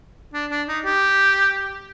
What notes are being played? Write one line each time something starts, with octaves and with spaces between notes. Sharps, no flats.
D4
D4
D#4
G4